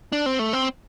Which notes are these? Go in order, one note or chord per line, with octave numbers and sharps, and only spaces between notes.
D4
C4
A3
C4